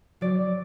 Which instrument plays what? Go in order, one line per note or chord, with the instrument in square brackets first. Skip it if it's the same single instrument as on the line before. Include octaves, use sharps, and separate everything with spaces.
[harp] F#3 D5